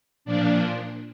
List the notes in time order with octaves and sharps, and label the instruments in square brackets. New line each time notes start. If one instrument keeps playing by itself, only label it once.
[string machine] A#2 F3 D4